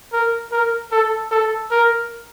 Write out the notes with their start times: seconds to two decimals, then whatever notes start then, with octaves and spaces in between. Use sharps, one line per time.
0.13 A#4
0.52 A#4
0.92 A4
1.31 A4
1.71 A#4